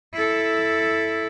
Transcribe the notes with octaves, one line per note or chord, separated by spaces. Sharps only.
E4 A4